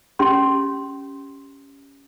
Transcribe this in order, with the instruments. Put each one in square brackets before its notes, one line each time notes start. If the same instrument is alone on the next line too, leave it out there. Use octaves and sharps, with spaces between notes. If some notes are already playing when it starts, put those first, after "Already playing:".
[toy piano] C#4 G4 C6